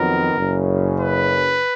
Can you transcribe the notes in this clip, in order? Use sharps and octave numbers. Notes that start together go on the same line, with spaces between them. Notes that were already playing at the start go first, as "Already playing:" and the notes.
Already playing: F2 D#3 F#3 B3 A#4
F#1 F#2 C#3
B4